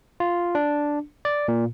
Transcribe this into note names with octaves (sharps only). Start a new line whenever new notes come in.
F4
D4
D5
A#2